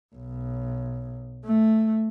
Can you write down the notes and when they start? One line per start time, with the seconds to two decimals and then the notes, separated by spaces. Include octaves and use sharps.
0.15 B1
1.45 A3